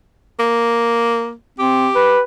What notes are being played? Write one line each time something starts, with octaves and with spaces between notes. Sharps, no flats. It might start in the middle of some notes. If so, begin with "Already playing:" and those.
A#3
C4 G4
B4